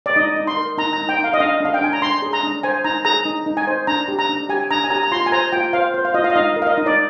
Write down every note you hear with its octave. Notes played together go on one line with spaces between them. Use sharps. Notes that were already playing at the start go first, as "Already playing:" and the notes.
D5
D#4 D#5
D#4
C6
A#4
D#4 A#5
D#4 A#5
G5
D#4
F5
D#5
D4 F5
D4 F5
G5
D4 G#5
A#5
D4 C6
G#4
A#5
D4
C5 G#5
D#4 A#5
G#4 A#5
D#4
D#4
G#5
C5
D4 A#5
G4
A#5
D4
G4 G#5
D4 A#5
G#5
G4 A#5
A#5
F4 C6
G#5
C5 A#5
F4 G5
C5 F5
C5
F5
F4 D#5
F5
D#5
D#4 F5
A#4
F5
D#5
D#4
D5